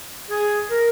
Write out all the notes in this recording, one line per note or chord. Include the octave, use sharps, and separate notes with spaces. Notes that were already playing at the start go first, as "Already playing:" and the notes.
G#4
A#4